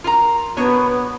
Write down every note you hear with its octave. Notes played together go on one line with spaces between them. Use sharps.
F4 A#4 A#5
B2 B3 D4 C#5